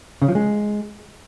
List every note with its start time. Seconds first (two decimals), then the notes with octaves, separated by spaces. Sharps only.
0.22 C#3
0.28 F3
0.35 G#3